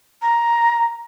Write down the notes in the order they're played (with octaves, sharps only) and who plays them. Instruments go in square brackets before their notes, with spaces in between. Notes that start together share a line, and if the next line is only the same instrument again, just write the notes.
[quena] A#5